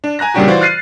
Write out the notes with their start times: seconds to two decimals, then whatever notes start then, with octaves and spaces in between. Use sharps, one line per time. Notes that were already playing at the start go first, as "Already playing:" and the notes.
0.04 D4
0.19 G#5 A#5 F#6 A#6
0.34 A#2 C#3 G3 D4 F#4 G4
0.48 E3 F4 F#4 C5 D5
0.61 F6 F#6 A6 C7 D#7